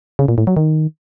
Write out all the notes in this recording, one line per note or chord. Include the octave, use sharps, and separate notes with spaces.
C#3
A#2
A2
F#3
D#3